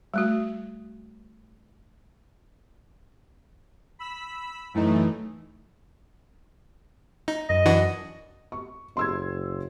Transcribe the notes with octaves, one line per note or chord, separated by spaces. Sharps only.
G3 A3 F#4
B5 E6 B6
F#2 A2 E3 A3 D#4
D#4
F#2 D#5
E3 D4 F#4
C#6
F#1 C6 E6 G#6